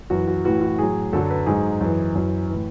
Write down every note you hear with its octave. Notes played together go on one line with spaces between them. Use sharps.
F#2 E3 F#4
F#4
A2 E3 F#4
F#4
A2 F#3 G#4
F#2 D3 F#3 A4
B4
G#2 F#3 G#4
F#2 E3
F#2 E3
A2 E3